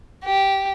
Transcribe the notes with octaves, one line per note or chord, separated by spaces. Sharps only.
G4